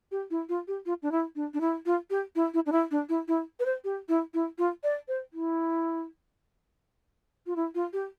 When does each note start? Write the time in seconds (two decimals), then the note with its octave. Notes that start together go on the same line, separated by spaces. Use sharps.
0.11 G4
0.30 E4
0.49 F4
0.68 G4
0.86 F4
1.02 D4
1.12 E4
1.36 D4
1.54 D4
1.61 E4
1.86 F4
2.10 G4
2.35 E4
2.54 E4
2.66 D4
2.72 E4
2.91 D4
3.09 E4
3.28 E4
3.60 B4
3.66 C5
3.84 G4
4.09 E4
4.34 E4
4.58 F4
4.84 D5
5.08 C5
5.33 E4
7.46 F4
7.56 E4
7.75 F4
7.93 G4